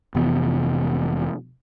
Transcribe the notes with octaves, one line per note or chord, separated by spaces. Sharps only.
F1 C3 E3 B3